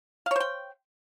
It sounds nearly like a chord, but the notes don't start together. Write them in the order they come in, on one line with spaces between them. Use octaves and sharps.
F5 C#5 C5 G5